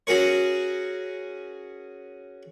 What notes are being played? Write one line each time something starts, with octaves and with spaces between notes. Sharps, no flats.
C#4 F#4 G#4 A#4 C#5